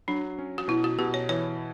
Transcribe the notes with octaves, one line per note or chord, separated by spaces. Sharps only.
F#3 D4
C#4
F#4
B2 E4
F#4
B2 G4
C#5
E3 C#5